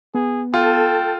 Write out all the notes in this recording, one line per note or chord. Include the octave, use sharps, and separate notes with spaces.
B3 G#4
F4 A4 G5